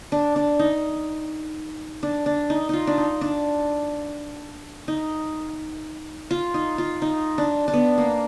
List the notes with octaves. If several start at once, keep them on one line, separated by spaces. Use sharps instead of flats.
D4
D4
D#4
D4
D4
D#4
D#4 F4
D4
D#4
D4
D#4
F4
D#4
F4
D#4
D4
D4
B3
A#3